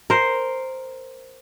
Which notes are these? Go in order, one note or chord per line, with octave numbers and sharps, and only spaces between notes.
A#4 C5